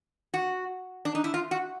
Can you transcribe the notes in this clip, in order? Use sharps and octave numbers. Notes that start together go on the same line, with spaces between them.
F#4
D4
D#4
E4
F4
F#4